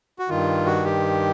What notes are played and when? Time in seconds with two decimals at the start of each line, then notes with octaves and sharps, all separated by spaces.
0.19 F#4
0.29 G2 D#3 F4
0.66 F#4
0.84 G4